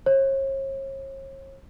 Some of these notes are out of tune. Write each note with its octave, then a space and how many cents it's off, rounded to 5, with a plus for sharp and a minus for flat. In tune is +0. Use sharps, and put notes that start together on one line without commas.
C#5 -40